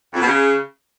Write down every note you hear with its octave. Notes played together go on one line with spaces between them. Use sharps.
F2
B2
C#3